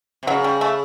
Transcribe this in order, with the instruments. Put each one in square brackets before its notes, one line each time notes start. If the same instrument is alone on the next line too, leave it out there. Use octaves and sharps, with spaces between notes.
[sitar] C3
[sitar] C#3 [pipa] F#3
[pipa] G3
A3